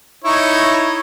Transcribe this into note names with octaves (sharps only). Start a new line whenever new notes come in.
D#4 E4 C#5